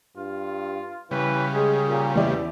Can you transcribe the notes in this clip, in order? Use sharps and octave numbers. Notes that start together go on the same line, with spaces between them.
G2 F4
C#3 E3 G3 B4
G#3 G#4
A#2
E2 E3 G4 D5 E5